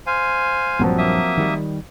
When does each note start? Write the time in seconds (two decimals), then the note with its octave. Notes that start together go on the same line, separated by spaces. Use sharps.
0.07 C5 F5 G#5
0.79 A#1 G2 F3 F#3 C4
0.98 A#3 E5 D#6
1.37 D#3 G3